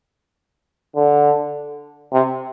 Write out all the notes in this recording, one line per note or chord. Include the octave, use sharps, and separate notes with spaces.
D3
C3